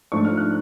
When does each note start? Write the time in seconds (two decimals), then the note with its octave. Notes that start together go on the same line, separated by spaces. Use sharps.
0.12 G#2 F3 A3 D4 C#6
0.25 F6
0.37 F#6